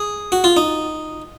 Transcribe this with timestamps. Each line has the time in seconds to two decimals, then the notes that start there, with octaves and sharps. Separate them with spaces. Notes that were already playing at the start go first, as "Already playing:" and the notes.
Already playing: G#4
0.32 F#4
0.44 F4
0.57 D#4